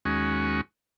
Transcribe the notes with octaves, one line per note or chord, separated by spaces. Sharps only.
D#2 G#3 C#4 F#4